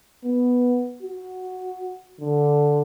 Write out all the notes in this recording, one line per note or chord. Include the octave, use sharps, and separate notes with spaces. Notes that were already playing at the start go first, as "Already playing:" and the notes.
B3
F#4
D3